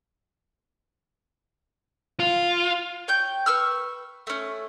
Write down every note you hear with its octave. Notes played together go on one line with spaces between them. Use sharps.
F4
C#5 G5 G6
B4 C#6 E6 F6
A3 C#4